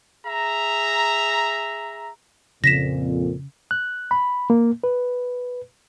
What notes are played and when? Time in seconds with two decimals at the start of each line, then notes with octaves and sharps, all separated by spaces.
0.25 G#4 E5 A#5
2.64 F2 A#2 C#3 A#6 B6 E7
3.71 F#6
4.11 B5
4.50 A#3
4.84 B4